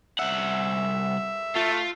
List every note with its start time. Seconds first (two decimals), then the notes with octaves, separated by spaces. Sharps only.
0.19 C2 E5 F#5
1.56 A3 F4